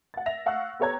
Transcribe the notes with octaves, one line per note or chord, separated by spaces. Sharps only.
F#5 A6
E5 A#6 F7
F5 F#5 C#6 E6 F#6
B3 G4 A4 C#5 A#5 G#6